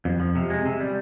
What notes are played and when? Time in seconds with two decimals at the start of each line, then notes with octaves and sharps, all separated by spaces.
0.05 F2
0.20 F3
0.35 C3
0.50 G#3
0.65 C3
0.80 G3